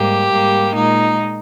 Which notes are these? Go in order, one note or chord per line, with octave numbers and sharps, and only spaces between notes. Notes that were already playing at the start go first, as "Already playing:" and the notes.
Already playing: G#2 G3 A#3 G4
G#2 G3 A#3
A#2 G#3 D#4